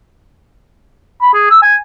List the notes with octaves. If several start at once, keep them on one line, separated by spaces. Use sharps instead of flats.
B5
G#4
E6
G#5